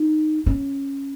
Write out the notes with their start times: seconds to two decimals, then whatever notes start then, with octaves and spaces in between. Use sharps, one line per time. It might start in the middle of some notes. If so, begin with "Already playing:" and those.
Already playing: D#4
0.46 C#4